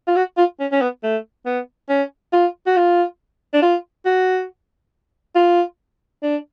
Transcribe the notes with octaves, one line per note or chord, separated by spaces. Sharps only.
F4
F#4
F4
C#4
C#4
B3
A3
B3
C#4
F4
F#4
F4
D4
F4
F#4
F4
D4